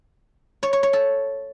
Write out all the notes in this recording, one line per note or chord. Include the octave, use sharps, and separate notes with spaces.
C#5
C#5
C#5
A4